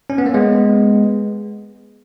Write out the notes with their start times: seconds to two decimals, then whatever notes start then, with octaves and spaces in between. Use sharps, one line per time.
0.10 C#4
0.18 B3
0.26 A#3
0.34 G#3 B3